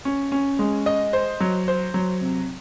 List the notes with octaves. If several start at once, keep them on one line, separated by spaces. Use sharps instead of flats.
C#4
C#4
G#3
D#5
C5
F#3
C5
F#3
C3